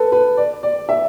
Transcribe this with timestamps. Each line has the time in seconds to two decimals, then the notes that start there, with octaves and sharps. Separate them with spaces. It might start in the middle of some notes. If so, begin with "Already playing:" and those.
Already playing: A4 B4
0.12 B4
0.37 D5
0.63 D5
0.89 E5